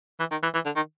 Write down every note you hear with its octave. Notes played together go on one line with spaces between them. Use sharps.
E3
D#3
E3
E3
D3
D#3